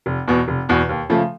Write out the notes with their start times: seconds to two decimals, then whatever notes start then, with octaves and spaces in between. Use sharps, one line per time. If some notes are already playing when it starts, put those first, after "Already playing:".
0.06 F1
0.28 E2 B2
0.48 F1
0.69 E2 B2
0.89 D#2
1.09 C#3 F3 A3